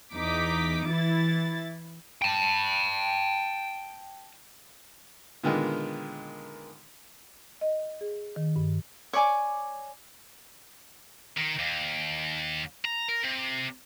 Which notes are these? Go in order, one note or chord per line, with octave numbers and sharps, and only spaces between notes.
E2 D#4 D6 B6
E3 E4 A6
G5 A5
A#2 D3 D#3 G#3 A#3 B3
D#5
G#4
D#3
G2
C#5 D5 G#5 D6
D#3
D#2
A#5
A#4
C3